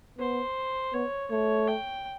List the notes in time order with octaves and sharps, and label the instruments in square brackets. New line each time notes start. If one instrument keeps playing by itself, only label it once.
[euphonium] B3 [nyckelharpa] C5
[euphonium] B3 [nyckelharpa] C#5
[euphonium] A3 [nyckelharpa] C#5
[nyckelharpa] G5